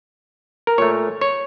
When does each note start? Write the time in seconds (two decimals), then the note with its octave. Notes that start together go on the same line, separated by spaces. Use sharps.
0.67 A#4
0.78 A#2 A3 C#5
1.21 C#5